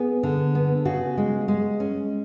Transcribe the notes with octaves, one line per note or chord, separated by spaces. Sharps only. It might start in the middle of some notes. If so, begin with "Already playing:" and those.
Already playing: B3 G#4
D3
B3
C#3 F#4
G#3
G#3
C#4